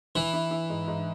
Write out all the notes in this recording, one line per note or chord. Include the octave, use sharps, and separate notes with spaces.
E3 E4
E4
E4
G#2
G#2